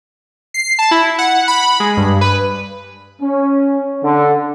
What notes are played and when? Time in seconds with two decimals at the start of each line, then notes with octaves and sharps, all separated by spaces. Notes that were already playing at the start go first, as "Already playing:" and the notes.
0.54 C7
0.79 A5
0.91 E4
1.18 F#5
1.48 B5
1.80 G#3
1.97 G2
2.21 B4
3.22 C#4
4.03 D3